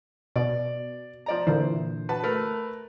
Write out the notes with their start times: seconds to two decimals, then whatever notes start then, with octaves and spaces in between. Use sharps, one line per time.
0.36 B2 D5
1.26 F3 D5 A#5
1.47 A#2 D3 E3 C5
2.09 F#4 B4 A5
2.24 A3 A#4 B4